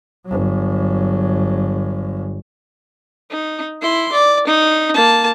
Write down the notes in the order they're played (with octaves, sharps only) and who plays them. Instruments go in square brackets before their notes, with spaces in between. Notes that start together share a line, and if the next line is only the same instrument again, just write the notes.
[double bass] G1 F#3
[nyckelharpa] D#4
E4 C6
D5
D#4
A#3 A5